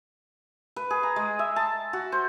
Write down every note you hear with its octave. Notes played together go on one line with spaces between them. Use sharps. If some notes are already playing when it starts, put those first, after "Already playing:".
B4
G#4
A#5
G#3
E5
A5
F#4
C5